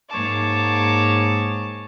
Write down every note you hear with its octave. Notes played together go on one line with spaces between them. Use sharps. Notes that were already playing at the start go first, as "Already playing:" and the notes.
G#2 A#3 C#5 A5 D6